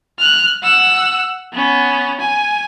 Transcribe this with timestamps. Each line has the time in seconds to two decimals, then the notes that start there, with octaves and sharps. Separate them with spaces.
0.18 F6 F#6
0.63 F#5 E6
1.53 B3 C#4
2.20 G#5